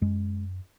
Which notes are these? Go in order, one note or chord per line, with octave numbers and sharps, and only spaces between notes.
F#2 G#3